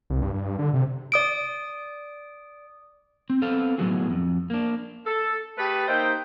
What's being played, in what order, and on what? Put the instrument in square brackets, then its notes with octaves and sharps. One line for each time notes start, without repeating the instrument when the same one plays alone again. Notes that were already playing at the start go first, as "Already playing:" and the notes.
[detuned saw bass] C2
G2
G2
D3
C3
[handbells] D5 D#6 D7
[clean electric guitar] C4
B3 C4 A4 F5
A2 F#3 G3 B3 F#4 G#4
F2
A#3 D4
[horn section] A4
A3 G4 G#4 B4
A#3 D#4 C5 D#5 E5 G5